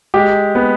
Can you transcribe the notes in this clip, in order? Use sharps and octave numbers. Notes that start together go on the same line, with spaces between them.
G#3 G4
B3